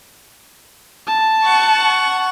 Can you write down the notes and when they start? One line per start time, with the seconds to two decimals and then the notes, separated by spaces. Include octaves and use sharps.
1.07 A5
1.42 F#5 C#6